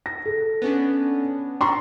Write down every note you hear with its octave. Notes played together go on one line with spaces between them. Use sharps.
A#6
A4
B3 C#4 D4
D4 A#5 C6 C#6